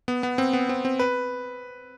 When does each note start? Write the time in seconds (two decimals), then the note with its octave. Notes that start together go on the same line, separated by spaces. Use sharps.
0.08 B3
0.23 B3
0.38 C4
0.53 B3
0.69 C4
0.85 C4
0.99 B4